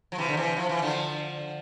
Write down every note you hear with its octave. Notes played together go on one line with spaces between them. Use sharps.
F3
C3 E3
D3
C3 E3
F3
E3
D3 F3